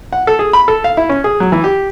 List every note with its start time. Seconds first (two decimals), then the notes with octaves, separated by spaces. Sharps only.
0.13 F#5
0.27 A4
0.39 G#4
0.53 B5
0.68 A4
0.84 F5
0.97 E4
1.09 C#4
1.24 G#4
1.40 F#3
1.52 E3
1.64 G4